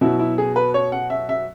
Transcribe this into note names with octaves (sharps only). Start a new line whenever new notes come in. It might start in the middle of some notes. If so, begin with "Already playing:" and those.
B2 F#3 E4
E4
G#4
B4
C#5
F#5
E5
E5